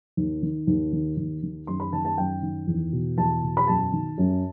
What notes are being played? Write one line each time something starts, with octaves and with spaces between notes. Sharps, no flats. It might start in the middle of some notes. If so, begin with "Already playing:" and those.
D#2
D#3
D#2
D#3
D#2
D#3
F#2 C6
B5
D#3 A5
A5
F#2 G5
D#3
E2
B2
E2 A5
B2
B5
F#2 A5
D#3
F#2